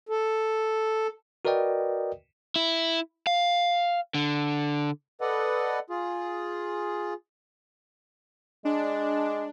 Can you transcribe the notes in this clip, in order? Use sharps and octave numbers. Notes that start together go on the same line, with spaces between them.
A4
F#4 A#4 B4 D5 D#5 G5
E4
F5
D3
A4 B4 D5 D#5 F#5
F4 G#4
G#3 D4